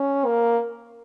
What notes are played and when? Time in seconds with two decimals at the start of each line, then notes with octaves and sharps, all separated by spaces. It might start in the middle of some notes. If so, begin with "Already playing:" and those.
Already playing: C#4
0.25 A#3